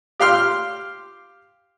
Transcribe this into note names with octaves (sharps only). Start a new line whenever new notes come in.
G4 F5 C6 F6